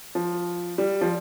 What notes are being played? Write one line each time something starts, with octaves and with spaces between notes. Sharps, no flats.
F3
G3
F3